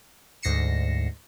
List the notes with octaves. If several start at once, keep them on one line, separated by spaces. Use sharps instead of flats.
D2 G#2 A#6 C7 C#7 E7